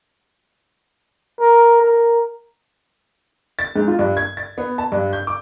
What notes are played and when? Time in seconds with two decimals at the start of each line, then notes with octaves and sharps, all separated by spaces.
1.40 A#4
1.82 A#4
3.59 A6
3.76 G#2
3.88 F4
3.99 G2
4.17 G#6
4.37 A6
4.58 B3
4.78 A5
4.92 G2
5.13 G6
5.27 D6